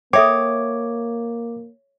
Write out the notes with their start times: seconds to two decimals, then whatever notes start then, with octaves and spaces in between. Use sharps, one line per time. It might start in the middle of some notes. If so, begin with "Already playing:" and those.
0.13 A#3 A4 C#5 E5 G5 D6